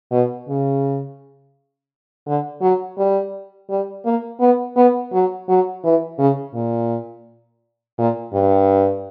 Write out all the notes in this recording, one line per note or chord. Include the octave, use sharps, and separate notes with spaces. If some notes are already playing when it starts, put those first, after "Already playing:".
B2
C#3
D3
F#3
G3
G3
A#3
B3
B3
F#3
F#3
E3
C#3
A#2
A#2
G2